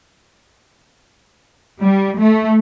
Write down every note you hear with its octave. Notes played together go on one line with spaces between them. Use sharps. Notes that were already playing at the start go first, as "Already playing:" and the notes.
G3
A3